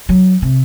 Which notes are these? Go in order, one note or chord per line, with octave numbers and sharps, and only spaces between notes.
F#3
C3